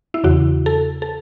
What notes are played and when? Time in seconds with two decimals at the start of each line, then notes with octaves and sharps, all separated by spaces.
0.14 E4
0.24 E2 C#3 E3 F#4
0.66 A4
1.02 A4